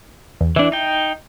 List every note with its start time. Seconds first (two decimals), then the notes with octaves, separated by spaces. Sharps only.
0.41 E2
0.56 E3 D4 E4
0.72 D#4 G5